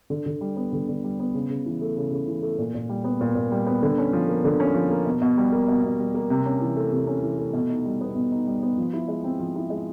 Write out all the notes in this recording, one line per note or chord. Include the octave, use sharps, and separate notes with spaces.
D3
D3
G3
B3
D3
D3
G3
B3
C#3
C#3
E3
A3
C#3
C#3
E3
A3
A#2
A#2
G3
B3
A#2
A#2
G3
B3
D3
C#4
F3
A#3
D3
C#4
F3
A#3
B2
B2
G3
A#3
B2
B2
G3
A#3
C3
C#4
E3
A3
C3
C#4
E3
A3
B2
D#4
G3
B3
B2
D#4
G3
B3
F3
E4
G#3
C4
F3
E4
G#3